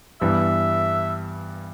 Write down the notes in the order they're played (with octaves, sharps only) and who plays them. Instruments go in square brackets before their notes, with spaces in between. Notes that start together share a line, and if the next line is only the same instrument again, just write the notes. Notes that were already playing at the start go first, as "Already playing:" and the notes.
[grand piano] G2 E3 G3 B3 [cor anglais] E5